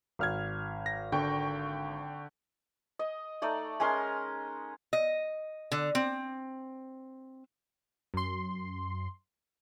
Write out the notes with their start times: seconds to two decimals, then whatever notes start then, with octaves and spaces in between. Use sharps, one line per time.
0.19 G#1 F6 G#6
0.86 A#6
1.12 D3 G5 C#6
2.99 D#5
3.42 A3 D#4 D5
3.80 G#3 C#4 A#4 C6
4.93 D#5
5.72 D3
5.95 C4
8.14 F#2 C6